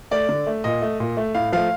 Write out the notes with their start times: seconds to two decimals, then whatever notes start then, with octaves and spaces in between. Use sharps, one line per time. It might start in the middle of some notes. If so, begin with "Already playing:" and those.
0.11 A3 D5
0.29 D3
0.47 A3
0.64 A#2 D#5
0.82 A3
1.00 A#2
1.17 A3
1.35 A2 F5
1.53 F3 A3 F5